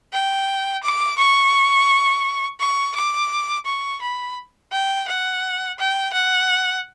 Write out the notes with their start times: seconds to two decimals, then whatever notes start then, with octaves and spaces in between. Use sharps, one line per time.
0.13 G5
0.83 D6
1.18 C#6
2.60 C#6
2.95 D6
3.65 C#6
4.02 B5
4.72 G5
5.08 F#5
5.79 G5
6.13 F#5